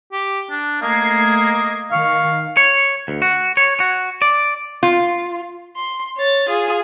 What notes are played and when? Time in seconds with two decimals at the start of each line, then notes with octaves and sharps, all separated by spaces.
0.13 G4
0.51 D4
0.82 A3 A#3 D#5 G#6 C7
1.92 D#3 F5 C#6
2.57 C#5
3.08 D2
3.22 F#4
3.57 C#5
3.80 F#4
4.22 D5
4.83 F4
5.76 C6
6.17 C#5 A6
6.49 F4 G#4